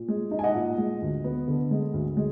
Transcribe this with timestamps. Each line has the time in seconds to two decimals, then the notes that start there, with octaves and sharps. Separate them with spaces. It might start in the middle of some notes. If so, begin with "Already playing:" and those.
Already playing: A#2
0.08 G#3
0.31 D#4
0.39 G#5
0.43 D#5 F#5
0.55 A#2
0.78 G#3
1.02 D2
1.24 B3
1.48 D3
1.71 G#3
1.94 D2
2.17 G#3